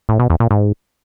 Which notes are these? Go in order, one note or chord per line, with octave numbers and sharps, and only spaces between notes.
A2
B2
E2
A#2
G#2